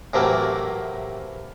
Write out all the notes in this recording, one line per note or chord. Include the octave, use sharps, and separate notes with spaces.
A2 C3 E3 F#3 A3 A#3